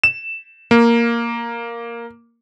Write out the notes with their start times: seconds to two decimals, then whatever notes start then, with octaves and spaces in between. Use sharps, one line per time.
0.04 E7
0.71 A#3